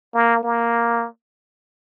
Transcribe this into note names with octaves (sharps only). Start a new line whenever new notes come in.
A#3
A#3